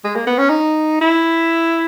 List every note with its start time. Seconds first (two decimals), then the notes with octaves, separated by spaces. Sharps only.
0.04 G#3
0.16 A#3
0.27 B3
0.38 C#4
0.49 D#4
1.01 E4